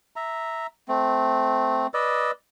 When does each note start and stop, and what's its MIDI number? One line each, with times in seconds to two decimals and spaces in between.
0.16 0.67 76
0.16 0.67 82
0.88 1.87 57
0.88 1.87 60
1.94 2.31 71
1.94 2.31 74
1.94 2.31 75
1.94 2.31 88